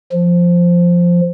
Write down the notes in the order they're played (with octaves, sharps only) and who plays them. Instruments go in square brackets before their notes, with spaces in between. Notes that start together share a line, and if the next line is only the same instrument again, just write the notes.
[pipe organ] F3